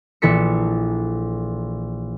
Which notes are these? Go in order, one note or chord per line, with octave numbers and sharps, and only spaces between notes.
A#1 E3 A4 B6 C#7